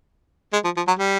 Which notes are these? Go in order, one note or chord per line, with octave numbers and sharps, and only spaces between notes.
G#3
F3
F3
F#3
G3